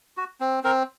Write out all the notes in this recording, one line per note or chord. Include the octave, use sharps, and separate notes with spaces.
F#4
C4
C4 A#4